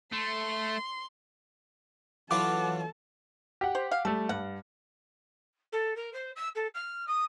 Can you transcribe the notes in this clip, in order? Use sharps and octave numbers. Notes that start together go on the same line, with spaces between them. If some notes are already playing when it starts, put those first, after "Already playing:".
A3 C6
E3 F#3 F4 A4 F#5 A5 D6
G4 F#5
C5
F5
G3 A3 A4
G2 F#5
A4
A#4
C5
E6
A4
F6
D#6